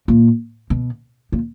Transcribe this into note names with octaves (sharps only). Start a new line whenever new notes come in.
A#2
B2
A#2